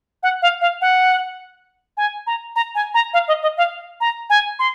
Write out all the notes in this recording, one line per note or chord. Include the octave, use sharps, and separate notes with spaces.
F#5
F5
F5
F#5
G#5
A#5
A#5
G#5
A#5
F5
D#5
D#5
F5
A#5
G#5
C6